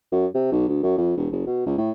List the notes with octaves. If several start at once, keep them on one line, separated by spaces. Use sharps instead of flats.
F#2
C3
B1
D2
F#2
F2
E1
F#1
B2
C#2
A2